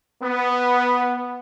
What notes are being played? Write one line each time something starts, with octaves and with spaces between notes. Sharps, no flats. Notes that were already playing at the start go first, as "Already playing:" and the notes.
B3